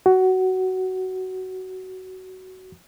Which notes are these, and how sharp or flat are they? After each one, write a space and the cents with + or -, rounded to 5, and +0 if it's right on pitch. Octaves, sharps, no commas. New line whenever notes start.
F#4 +15